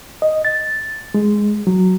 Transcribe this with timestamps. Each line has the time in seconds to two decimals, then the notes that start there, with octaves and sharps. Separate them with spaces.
0.22 D#5
0.45 A6
1.14 G#3
1.67 F#3